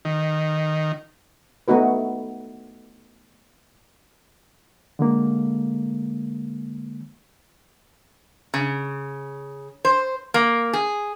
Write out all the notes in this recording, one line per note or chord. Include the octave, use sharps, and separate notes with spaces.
D#3
A3 B3 D#4 F#4 B4
D3 G#3 A#3
C#3
C5
A#3
G#4